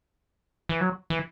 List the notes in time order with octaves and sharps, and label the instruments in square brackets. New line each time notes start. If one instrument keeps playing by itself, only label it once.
[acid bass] E3
F#3
E3